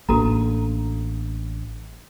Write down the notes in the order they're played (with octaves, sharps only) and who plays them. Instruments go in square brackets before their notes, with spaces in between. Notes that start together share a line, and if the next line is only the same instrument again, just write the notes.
[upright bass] A1 [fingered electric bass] A#3 D4 [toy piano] F#4 A4 A#5